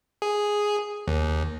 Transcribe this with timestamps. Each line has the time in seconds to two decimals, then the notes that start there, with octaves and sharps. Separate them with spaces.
0.22 G#4
1.07 D#2